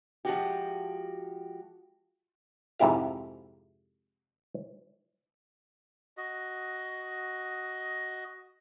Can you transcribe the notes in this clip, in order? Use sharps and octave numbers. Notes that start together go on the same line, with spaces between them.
F3 G#3 F#4 G4
F2 G#2 C3 E4 G4 F5
F#4 D#5